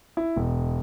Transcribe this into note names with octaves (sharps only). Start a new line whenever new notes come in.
E4
E1